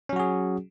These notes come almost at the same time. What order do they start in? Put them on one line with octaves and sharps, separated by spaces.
C#4 F#3 F#4 G#4